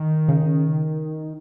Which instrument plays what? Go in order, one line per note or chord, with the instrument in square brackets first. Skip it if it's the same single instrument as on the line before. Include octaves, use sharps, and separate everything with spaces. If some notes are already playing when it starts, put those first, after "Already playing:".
Already playing: [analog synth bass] D#3
[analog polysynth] C#3